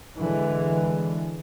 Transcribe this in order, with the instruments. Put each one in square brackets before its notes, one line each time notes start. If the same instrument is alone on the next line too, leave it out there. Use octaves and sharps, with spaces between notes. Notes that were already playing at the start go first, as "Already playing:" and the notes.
[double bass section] D3 E3 G#3